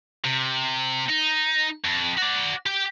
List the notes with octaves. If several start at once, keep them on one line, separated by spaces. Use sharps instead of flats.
C3
D#4
F2
F#4 D5
G4 G5